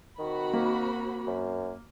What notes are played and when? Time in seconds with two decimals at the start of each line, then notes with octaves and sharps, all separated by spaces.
0.19 D#3 C4 F#4 B5
0.53 A#3
1.27 F#2